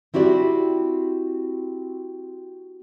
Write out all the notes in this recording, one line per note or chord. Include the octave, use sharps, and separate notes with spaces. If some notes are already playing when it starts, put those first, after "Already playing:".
C4 E4 F#4 G4 D5